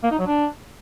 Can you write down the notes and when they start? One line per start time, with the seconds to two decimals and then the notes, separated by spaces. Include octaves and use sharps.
0.03 A#3
0.11 D#4
0.19 F#3
0.27 D4